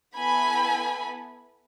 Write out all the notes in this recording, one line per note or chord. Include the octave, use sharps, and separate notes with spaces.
B3 E4 A4 G#5 B5